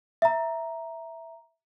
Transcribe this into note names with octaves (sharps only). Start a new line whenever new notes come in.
E5 A#5